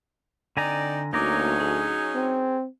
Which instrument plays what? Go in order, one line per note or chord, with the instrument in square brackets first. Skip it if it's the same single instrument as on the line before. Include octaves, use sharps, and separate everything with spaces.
[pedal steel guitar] D3 G#5 A#5 [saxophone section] C4 D#4 D5
[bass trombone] D2 [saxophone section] F#3 C#4 D#4 [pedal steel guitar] A#3 A#5 D6
[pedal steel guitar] G#4
[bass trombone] C4